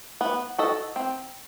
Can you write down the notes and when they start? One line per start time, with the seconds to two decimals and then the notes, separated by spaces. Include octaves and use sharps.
0.21 B3
0.58 F#4 A4 D#5
0.96 C4